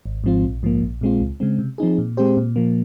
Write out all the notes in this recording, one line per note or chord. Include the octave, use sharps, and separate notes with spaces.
G#1
G#2 F3 C4 F4
A#1
G#2 F3 A#3
A#1
A#2 G#3 C4 F4
C#2
C#3 G#3 C4
C3
F3 C4 D#4 G#4
A#2
G#3 C4 G4 C5
A#2
F3 A#3